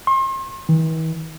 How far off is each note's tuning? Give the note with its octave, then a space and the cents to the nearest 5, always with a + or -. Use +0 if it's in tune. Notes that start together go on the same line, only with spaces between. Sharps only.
C6 +40
E3 -45